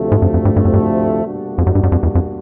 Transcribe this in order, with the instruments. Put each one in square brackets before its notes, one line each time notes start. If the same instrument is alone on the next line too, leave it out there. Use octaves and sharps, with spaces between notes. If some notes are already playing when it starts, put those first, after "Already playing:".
Already playing: [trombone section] D2 C3 F3 A3
[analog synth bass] G#2
F#2
F2
G2
G2
F#2
G2
[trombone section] B2 G3 A#3 D4 F#4
[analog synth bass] F2
F#2
G2
F#2
F2
E2
F2